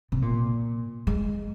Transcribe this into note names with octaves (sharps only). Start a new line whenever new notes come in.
C3
A#2
G#3